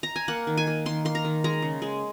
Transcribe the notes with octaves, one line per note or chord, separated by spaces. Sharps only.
A#5
G#5
A#3 F#5
D#3
G#5
A#3
D#3 C6
A#3 C6
A#5
D#3
G#3 A#5
C#3
G#3